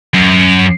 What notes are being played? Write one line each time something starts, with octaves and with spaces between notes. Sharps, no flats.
F#2